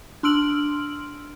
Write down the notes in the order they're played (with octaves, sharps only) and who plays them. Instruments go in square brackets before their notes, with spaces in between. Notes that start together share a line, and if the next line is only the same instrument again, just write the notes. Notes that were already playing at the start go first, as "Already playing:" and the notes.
[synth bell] D4 C6 E6 F6 D7 F#7